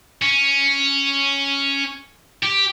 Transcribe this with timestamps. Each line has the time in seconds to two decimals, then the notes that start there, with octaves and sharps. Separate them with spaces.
0.22 C#4
2.43 G4